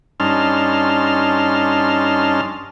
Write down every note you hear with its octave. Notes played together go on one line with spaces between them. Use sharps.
G2 C#4 D#4 A5 C6 F6